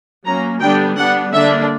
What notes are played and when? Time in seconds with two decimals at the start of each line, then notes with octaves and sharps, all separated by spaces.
0.25 F#3 A#3 C#4 A#5
0.60 D3 G3 B3 D4 G5
0.97 G3 B3 D4 F#5
1.32 D3 A#3 D4 E5